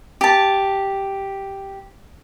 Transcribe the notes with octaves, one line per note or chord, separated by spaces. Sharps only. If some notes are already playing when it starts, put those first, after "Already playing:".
G4 A5